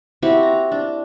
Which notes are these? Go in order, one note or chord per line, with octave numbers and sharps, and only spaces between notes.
C4 E4 F#4 G4
A#5
D4